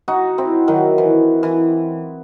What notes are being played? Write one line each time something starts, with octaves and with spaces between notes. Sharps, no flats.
D#4 F#4
C4 E4
D#3 F#3
E3
E3